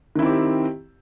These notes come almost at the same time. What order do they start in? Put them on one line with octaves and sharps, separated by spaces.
D#3 E4 C4 G4